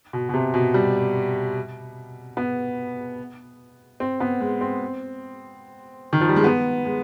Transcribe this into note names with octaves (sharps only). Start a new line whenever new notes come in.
B2
B2
C3
B2
G3
B3
C4
B3
G#3
C4
D#3
F3
G3
G#3
B3
G#3